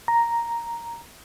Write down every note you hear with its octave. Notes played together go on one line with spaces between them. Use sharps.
A#5